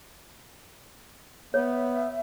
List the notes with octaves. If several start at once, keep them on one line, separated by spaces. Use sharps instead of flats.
B3 C#5 E5